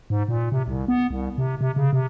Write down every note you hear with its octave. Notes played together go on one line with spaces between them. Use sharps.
G#2
A#2
C3
C2
B3
C2
C3
C3
C#3
C3